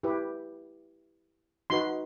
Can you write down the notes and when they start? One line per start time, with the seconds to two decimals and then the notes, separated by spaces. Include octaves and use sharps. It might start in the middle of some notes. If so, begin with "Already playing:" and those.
0.03 E4 G4 B4
1.70 D#4 F#4 B4 C6